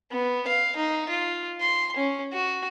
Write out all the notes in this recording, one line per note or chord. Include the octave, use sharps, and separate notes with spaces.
B3
F5
D#4
F4
C6
C#4
F#4